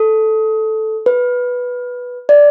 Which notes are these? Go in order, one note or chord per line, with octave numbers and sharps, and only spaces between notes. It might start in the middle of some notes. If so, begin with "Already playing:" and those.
Already playing: A4
B4
D5